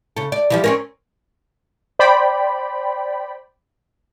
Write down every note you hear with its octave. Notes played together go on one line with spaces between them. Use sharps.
C#3 A4
D5
E3 F3 G3
C4 C#4 A#4
C5 D5 G5 B5